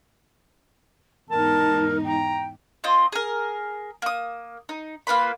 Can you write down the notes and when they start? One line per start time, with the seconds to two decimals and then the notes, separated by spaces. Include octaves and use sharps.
1.31 E2 G#2 D#4 A#4 A5
2.04 G5 A#5
2.84 C4 F4 D#5
3.12 G#4 A#4
4.02 A#3 D#6
4.69 D#4
5.07 A#3 F4 B4 B5